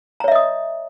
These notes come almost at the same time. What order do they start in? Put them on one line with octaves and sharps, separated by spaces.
A#5 C#5 E5 D#5 D#6